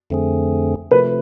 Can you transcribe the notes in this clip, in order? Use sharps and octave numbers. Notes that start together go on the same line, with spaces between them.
F2 D3 A3 C4 G#4
C3 F3 A3 B4